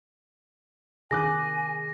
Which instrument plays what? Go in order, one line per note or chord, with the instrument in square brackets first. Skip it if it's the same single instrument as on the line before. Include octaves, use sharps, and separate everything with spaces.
[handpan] C3 D#3 [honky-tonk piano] G#4 D6 F#6 [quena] G#5 [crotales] A#6